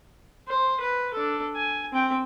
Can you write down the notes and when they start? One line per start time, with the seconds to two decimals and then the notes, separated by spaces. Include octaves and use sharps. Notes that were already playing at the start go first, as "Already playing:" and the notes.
0.48 C5
0.80 B4
1.14 D4 A4
1.55 G#5
1.93 C4 G5